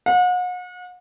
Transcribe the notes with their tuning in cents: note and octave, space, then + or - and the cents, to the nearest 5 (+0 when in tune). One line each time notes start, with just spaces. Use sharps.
F#5 -40